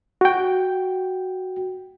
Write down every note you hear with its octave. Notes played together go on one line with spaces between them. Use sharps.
F#4 G5